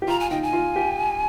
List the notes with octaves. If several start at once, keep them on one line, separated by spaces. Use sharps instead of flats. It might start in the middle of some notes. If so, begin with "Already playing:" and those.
G4
F4 A#5
G#5
D#4 G5
G#5
F4
G4